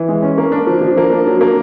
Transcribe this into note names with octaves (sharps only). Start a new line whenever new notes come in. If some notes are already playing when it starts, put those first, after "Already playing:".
Already playing: E3
G#3
C#4
A#3
D4
F3
F3
A#3
D4
F#3
A#3